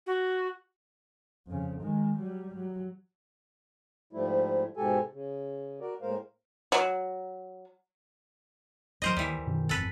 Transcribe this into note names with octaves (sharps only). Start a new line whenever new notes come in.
F#4
F2 C#3
D#3 G#3
F#3 G3
F#3
G#2 F3 G3 A3 E4
G#2 B2 G#3 G4 A4 G#5
C#3
F#4 A#4 D5
A2 G#3 A#3 A#4 C5 F5
F#3
D#1 F#3 A#4 C5 D#5
D#2 E3 G3
F#2 B2 D#3
G1 F2 A4 B4